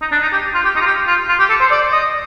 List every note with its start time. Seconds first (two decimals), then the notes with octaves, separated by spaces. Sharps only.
0.01 D#4
0.12 D4
0.22 D#4
0.32 G4
0.54 F4
0.65 G4
0.76 D#4
0.81 F4
0.86 G4
1.07 F4
1.29 F4
1.39 G4
1.50 A4
1.61 C5
1.71 D5
1.93 D#5